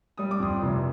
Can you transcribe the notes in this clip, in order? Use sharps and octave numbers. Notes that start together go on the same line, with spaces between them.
G3 D#6
D6
F2 C6 D#6
F1